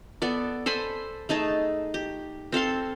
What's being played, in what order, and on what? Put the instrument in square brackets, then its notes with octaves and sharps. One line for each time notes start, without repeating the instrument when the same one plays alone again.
[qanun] B3 A4 D5
A4 C5 G#5 B5
A3 D#4 G#4 A5
G4
C4 A4 F5 C6